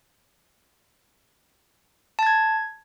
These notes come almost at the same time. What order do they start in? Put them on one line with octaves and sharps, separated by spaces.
A5 A6 G#6